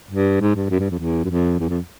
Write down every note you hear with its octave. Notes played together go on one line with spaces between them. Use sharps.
G2
G#2
G2
F#2
G2
F2
E2
F#2
F2
E2
F2